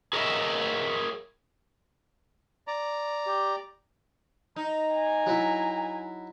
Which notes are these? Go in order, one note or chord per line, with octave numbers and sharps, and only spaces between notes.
G#4 A#4 C#5 D#5 E5
D5 A#5
G4
D#4 A#5
G#5
F#3 E4